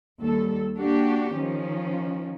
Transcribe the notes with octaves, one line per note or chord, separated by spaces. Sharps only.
D#2 G3 A4
A#3 D4 F#4 G4
D#3 F3 C#4